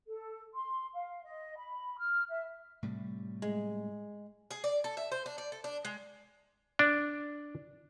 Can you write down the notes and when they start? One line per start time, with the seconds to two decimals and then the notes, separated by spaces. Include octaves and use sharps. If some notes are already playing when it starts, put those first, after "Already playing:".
0.07 A4
0.54 C6
0.94 F5
1.23 D#5
1.57 B5
1.98 F6
2.29 E5
2.83 A2 C3 G3
3.42 G#3
4.51 G#4
4.64 D5
4.84 A4
4.97 E5
5.12 C5
5.26 D4
5.38 D5
5.52 A4
5.64 D4
5.85 G#3
6.79 D4